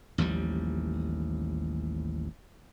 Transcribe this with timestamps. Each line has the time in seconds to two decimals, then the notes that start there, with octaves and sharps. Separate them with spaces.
0.18 A1 D#2 F3 G3